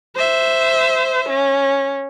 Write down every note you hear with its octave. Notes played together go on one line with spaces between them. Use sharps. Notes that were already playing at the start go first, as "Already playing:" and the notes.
C5 E5
C#4